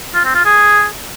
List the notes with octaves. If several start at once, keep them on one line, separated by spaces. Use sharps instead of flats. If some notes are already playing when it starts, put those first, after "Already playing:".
F4
C4
F4
G#4